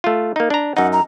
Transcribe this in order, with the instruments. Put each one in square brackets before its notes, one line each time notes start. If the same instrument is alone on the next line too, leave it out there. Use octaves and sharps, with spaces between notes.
[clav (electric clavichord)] A3 F4
A#3 D#4
D4 A#5
[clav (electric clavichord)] F#2 D#4 [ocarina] F#5
[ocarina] A#5